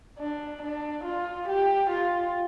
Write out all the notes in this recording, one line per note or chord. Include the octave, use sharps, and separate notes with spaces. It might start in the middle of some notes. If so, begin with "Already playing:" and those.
D4
D4
F4
G4
F4